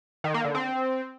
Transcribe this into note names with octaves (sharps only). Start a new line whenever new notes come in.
D#3
A#3
D3
C4